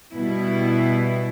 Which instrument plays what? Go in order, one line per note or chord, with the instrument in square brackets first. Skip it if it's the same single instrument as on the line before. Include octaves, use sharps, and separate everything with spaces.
[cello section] B2 G3 B3 E4